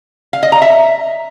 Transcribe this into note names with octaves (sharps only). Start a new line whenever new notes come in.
F5
D#5
A#5
E5